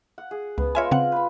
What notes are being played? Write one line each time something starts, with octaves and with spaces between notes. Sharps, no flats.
F#5
G#4
C#2 B3
G#3 F4 A#4 C#5 E5 G#5
C#3 C4 F#5
B4 B5